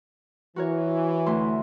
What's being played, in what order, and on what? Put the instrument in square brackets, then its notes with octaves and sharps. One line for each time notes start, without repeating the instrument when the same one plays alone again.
[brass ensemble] E3 [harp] F#4 A#4 C#5
[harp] D2 E4 C6